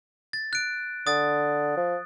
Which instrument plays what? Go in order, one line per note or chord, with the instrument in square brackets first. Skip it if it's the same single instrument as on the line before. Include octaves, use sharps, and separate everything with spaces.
[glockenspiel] A6
F#6 D7
[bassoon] D3 [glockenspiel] D#6 A6
[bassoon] F3